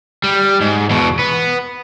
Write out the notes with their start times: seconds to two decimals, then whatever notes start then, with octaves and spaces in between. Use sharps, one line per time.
0.24 G3
0.61 G#2
0.90 E2 B2
1.19 B3